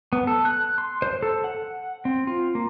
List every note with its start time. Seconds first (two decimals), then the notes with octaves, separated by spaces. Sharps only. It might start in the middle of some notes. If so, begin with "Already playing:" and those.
0.13 B3
0.27 A4
0.45 F#6
0.78 C6
1.02 C5
1.22 A4
1.44 F#5
2.05 C4
2.27 F4
2.55 A#3